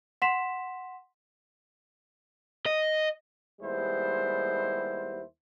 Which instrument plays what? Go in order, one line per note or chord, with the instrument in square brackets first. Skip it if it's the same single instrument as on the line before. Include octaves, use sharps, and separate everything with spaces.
[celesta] F#5 C6 B6 E7
[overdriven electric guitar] D#5
[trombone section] D#2 G3 G#3 B3 E4 C5